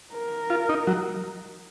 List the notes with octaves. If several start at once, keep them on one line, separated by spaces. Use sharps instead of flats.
A#4
F4
D#4
F#3